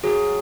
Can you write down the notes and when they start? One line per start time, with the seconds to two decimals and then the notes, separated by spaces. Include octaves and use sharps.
0.03 F#3 G#4